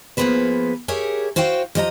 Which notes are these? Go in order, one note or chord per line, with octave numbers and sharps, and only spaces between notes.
F3 A#3 B3 G#4 B4 C5
G4 G#4 A#4 C#5 E5
F#4 C5 C#5 F5 G5
F3 G4 D#5 F#5 A#5